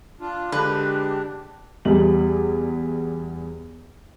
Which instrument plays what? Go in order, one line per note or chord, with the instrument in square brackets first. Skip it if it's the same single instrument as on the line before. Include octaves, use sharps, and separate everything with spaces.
[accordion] D4 F4
[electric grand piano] D3 [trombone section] G#3 G4 [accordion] D4 [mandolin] B4
[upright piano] E2 G3 F#7